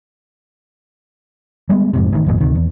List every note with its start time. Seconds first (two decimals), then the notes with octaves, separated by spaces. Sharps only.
1.69 G3 G#3 B3
1.94 F2 G#2 C3
2.12 A1 D#3
2.26 G#1 F2 A#2
2.41 D2 C3 D#3
2.55 E2